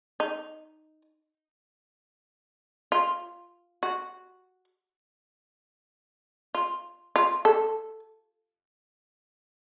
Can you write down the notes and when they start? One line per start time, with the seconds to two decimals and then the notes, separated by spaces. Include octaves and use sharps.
0.20 D#4
2.92 F4
3.83 F#4
6.55 F4
7.16 F4
7.45 A4